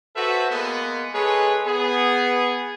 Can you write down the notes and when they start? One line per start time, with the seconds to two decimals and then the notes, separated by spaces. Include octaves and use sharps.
0.15 F#4 A4 B4 C5 E5
0.51 G#3 A#3 B3
1.14 G#3 G#4 A4 B4 C#5
1.66 B3 G#4